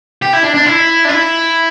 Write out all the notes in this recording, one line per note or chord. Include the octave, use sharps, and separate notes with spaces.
G4
E4
D4
D4
E4
D4
E4